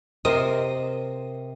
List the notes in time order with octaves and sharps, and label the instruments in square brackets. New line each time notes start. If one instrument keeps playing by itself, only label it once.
[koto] C3 [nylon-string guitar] A#4 C5 [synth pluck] D#5